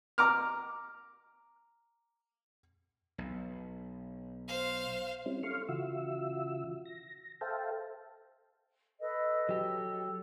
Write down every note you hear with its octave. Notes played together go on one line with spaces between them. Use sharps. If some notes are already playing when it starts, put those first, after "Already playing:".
A#5 D6 F6
B1
C5 F5
G3 C4 C#4 E4
A4 F5 C6 C#6 F6
C#3 E3 F4 F#4 E5 E6
A#6
A4 C5 E5 F5 G5 A5
A4 B4 D#5
F#3 G4 A4